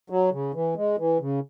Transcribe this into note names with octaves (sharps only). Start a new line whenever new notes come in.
F#3
C#3
E3
G#3
E3
C#3